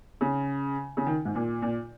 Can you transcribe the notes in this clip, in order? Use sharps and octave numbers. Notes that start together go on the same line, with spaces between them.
C#3
C#3
D#3
G#2
A#2
A#2